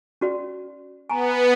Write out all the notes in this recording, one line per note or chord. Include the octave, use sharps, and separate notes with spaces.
C#4 F#4 D5
B3 G#5 A#5